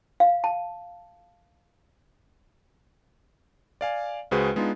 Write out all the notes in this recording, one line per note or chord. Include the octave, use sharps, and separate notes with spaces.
F5
A5
D5 F5 G#5
C#2 G#3 F#4 G#4 B4 C5
G#3 B3 D4 D#4 F4